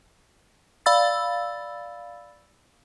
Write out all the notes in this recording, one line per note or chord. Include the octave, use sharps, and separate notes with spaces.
D5 F5 B5 E6 A6